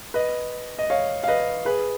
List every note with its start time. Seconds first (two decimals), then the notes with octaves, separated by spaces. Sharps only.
0.14 B4 D#5
0.78 D#5
0.90 C#5 F5
1.23 F5
1.28 B4 D#5
1.65 G#4 B4